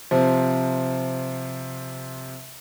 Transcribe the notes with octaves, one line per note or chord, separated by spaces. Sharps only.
C3 F3